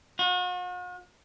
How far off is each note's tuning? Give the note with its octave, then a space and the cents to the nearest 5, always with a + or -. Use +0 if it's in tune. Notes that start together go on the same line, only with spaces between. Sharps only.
F#4 -45